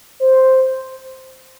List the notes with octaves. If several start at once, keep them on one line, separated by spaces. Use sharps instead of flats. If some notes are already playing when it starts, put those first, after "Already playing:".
C5